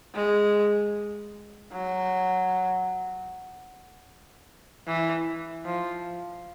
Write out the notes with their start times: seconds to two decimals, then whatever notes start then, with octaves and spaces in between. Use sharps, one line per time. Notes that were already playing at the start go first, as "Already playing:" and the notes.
0.15 G#3
1.72 F#3
4.87 E3
5.65 F3